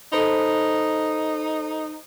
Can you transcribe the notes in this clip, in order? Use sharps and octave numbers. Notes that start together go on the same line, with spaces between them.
D#4 A4 C5 B5